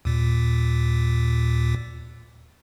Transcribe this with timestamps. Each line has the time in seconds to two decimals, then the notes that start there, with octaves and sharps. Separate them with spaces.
0.05 D#2 A#2